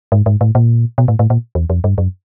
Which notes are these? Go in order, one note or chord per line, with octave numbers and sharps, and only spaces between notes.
G#2
G#2
A2
A#2
B2
A2
A2
A#2
E2
F2
G2
F#2